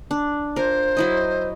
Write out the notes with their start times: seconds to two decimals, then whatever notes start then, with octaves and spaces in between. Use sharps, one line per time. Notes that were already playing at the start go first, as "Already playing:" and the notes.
0.11 D4
0.56 F4 A#4 C5
0.97 F#3 E4 D#5